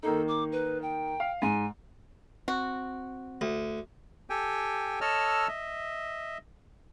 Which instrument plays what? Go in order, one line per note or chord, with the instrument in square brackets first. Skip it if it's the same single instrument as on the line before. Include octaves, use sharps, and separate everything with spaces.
[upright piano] D#3 A#3 D#4 [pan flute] A4
[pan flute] D6
B4
G5
[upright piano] F5
[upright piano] G#2 [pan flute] G#5
[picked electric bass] C4 [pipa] F#4
[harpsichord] D2
[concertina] G4 A4 G5 G#5
A4 C#5 D#5 A5 E6 F6
D#5 E5